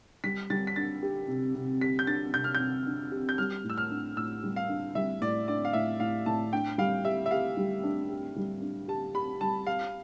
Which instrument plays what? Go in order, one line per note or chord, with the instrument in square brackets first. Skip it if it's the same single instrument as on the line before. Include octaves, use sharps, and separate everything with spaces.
[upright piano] G3 [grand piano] B6
[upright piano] G3 [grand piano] A6
[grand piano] B6
[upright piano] D4 [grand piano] A6
[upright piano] G4
C3
C3
[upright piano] G4 [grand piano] B6
[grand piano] G6
[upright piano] D4 [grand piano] A6
[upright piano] C3 [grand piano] G6
[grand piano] F6
[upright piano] C3 [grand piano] G6
[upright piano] D4
G4
[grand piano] G6
[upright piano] G3 [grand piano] F6
[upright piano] A2
[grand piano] E6
F6
[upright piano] D4
[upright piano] A2 [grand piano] E6
[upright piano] G3
[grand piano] F5
[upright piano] D4
[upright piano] G3 [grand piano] E5
[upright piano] A2 [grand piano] D5
[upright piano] D4 [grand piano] D5
[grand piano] F5
[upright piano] A2 [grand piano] E5
[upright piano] A2 [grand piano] F5
[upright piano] A2 [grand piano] A5
[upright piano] D4 [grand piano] G5
[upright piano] G3 [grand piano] F5
[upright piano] G4 [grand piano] E5
[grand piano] E5
[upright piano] G4 [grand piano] F5
[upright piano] G3
D4
G4
G3
D4
[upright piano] G4 [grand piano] A5
[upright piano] G4 [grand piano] B5
[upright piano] G3 [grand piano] A5
[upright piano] G4 [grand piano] F5